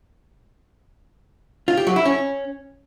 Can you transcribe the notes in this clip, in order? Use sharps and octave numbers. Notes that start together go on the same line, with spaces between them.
F4
G4
F#3
E4
C#4